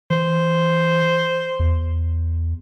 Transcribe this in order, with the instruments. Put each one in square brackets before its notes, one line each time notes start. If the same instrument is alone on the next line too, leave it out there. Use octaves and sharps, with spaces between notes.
[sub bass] E3 [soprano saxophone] C5
[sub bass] E2